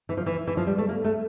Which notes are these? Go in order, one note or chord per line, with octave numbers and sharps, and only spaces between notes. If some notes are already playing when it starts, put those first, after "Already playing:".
E3
F3
E3
E3
F3
G3
A3
A#3
A3